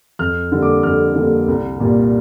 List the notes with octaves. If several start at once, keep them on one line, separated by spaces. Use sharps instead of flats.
F2 F6
D3 G3 A#3
D6
F2 F6
D3 G3 A#3
C2
A#2 G3 A#3